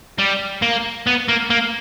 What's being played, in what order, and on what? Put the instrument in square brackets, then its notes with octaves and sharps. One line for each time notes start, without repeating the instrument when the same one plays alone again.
[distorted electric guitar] G3
A#3
B3
A#3
A#3